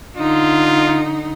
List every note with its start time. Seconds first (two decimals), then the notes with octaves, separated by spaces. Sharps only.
0.17 D3 D#4 F4